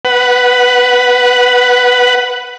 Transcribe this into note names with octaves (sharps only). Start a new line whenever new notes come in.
B4 F#5